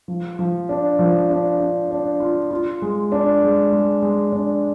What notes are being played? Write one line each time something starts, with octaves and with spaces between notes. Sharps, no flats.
F3
F3
D4
F3
D4
D4
D4
F4
F4
G#3
D4
G#3
G#3
G#3
D4